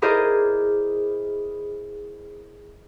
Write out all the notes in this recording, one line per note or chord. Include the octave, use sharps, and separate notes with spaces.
E4 G#4 A#4 C5 D5 D#5